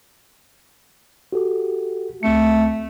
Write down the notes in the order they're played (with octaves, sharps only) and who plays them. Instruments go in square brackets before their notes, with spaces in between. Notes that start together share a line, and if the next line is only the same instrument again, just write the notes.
[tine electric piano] F#4 G4 A4
[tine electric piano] C#2 C4 C#7 [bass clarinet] A3